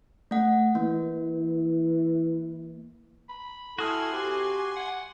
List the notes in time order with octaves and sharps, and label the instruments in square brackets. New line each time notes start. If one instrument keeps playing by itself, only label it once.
[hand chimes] A3 F#5
[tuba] E3 [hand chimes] A#3
[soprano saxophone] B5
[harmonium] E4 A4 [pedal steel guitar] F#4 D#6 F6 [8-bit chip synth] G#5 C6
[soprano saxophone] C4 [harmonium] G4
[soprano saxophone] F#5